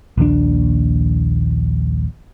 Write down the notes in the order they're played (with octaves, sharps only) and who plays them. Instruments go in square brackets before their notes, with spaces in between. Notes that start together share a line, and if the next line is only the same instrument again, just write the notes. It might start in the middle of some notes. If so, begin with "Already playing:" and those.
[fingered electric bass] A#1 D#2 D3 D4